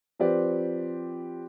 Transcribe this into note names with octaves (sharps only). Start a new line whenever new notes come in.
F3 C4 G4 B4 D5